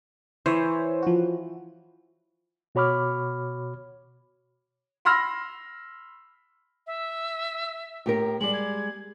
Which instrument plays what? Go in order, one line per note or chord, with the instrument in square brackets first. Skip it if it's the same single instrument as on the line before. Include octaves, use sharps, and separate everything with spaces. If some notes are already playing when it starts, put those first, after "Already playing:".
[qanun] E3 [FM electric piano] C5 C#5 E5
[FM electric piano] F3 F#4
[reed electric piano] B2 F#4 C#5 B5 D6 F6
[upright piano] B5 C6 E6 F6 A#6
[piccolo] E5
[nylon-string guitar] A2 G4 A#4
[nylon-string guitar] G3 G#3 [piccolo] F#7
[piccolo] G#6